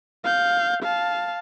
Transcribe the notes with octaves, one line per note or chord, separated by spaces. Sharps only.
F5 G6
F5 A5